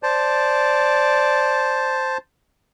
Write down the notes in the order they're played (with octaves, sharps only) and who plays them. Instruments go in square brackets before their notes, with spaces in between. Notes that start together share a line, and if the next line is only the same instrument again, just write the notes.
[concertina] C5 A5 [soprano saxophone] D5